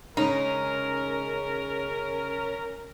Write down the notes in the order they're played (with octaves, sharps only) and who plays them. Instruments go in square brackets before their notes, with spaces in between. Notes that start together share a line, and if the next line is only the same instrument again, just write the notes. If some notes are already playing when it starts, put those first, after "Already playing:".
[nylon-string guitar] C#3 G#3 [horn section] C#4 A#4 [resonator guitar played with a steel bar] D#4